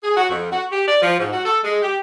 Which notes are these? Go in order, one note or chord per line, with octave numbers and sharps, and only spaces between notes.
G#4
F#4
F2
F#4
G4
D5
F3
G#2
F#4
A4
G#3
G4